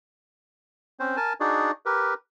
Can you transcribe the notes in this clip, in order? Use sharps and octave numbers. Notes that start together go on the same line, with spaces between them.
C4 C#4 C5
A#4 G#5 A5
D4 D#4 F#4 G#4 D5
G4 A#4 B4